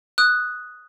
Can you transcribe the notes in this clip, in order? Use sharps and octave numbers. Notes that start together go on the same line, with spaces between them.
D#6 F#6